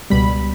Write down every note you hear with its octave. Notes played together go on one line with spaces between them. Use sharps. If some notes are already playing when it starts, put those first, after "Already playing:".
C#2 B2 G3 B5